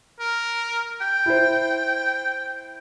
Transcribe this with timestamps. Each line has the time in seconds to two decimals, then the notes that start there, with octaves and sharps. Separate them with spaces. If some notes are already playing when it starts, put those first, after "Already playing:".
0.20 A#4
1.01 G5
1.26 E4 C5